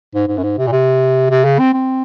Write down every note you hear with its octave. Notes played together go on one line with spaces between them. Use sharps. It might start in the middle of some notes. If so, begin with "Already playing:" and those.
G#2
G#2
F#2
G#2
C3
A#2
C3
C3
C#3
C4
C4